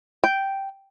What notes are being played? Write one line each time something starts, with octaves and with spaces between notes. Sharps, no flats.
G5